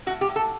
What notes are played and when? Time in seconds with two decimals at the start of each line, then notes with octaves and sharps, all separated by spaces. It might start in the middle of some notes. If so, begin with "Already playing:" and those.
0.06 A2 F#4
0.21 G4
0.29 A2
0.36 A4